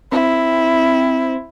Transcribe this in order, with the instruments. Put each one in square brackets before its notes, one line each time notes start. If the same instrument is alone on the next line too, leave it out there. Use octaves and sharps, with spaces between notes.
[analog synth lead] C4 [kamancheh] E4